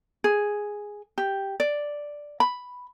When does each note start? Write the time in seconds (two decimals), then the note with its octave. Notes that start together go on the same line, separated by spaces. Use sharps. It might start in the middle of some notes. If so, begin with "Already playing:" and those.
0.24 G#4
1.18 G4
1.60 D5
2.40 B5